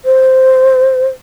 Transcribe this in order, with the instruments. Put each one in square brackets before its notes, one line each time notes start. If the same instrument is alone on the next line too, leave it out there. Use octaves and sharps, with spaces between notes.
[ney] C5